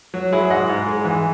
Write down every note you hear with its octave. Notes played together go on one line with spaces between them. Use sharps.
F#3
F#3 E4 G#4
G#2 D#5 F#5
G#2
G#3
E3